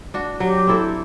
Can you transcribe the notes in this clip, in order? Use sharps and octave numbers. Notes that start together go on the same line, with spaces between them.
D4 F#4
F#3 G4
C4 E4 A4